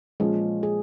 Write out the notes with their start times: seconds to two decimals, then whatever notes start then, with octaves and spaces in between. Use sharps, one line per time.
0.20 A#2 F3 G#3 C#4
0.63 G#4